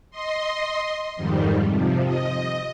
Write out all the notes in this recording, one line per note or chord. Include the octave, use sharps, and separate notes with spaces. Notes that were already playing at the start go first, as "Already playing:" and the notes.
D#5 C6
F2 G#2 D#3 G3
C3 F3
D#5